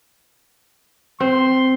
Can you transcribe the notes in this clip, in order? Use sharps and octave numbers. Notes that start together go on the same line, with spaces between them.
C4 C6